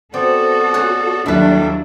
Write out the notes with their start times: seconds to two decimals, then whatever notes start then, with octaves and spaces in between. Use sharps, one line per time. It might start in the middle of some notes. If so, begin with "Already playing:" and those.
0.14 B3 C4 F#4 A4 D5
0.74 G#4 C#5 F#5
1.26 D#2 F#3 G3 D4 E4 A4 B4